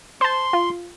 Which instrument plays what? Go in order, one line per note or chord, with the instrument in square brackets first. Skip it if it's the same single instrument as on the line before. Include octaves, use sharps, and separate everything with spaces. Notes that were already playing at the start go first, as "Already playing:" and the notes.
[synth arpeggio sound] C5 A5 [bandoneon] C6
[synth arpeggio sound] F4